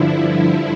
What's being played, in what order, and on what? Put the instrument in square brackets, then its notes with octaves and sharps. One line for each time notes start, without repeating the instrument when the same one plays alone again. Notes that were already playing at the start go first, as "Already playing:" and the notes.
Already playing: [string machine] G2 D3 F3 E4